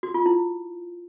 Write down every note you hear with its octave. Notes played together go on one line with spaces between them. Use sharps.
F#4
F4
E4